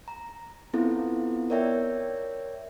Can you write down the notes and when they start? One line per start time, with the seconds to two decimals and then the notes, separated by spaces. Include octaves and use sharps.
0.08 A#5
0.74 B3 C4 E4 F4 A4
1.50 A#4 C#5 D5 E5 G5